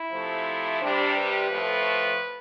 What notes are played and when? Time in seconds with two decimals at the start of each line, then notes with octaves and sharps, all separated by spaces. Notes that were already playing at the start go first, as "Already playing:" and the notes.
Already playing: E4
0.11 C3 F3 A3
0.80 C3 G3 D4
1.14 B4
1.50 A2 F3 A3